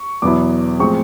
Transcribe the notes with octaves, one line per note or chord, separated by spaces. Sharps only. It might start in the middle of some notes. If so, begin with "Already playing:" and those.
Already playing: C#6
E2 B2 F#3 B3 E4 D6
A2 F3 G#3 C4 C#6